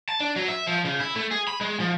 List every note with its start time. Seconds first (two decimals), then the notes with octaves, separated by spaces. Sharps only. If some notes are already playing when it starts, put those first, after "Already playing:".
0.09 A5
0.20 D4
0.36 F#3
0.48 E5
0.67 F3
0.85 C#3
1.00 E4
1.16 A3
1.31 G#4
1.47 B5
1.61 G#3
1.80 F3